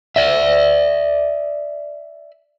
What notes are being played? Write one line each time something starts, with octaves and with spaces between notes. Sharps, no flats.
D5 E5